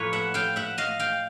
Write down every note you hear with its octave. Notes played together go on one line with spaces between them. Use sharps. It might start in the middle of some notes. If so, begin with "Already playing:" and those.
Already playing: A2 F3 A#3 B4 C#5
E5 F#5
F5 G5
E5 F#5
D#5 F5
F5 G5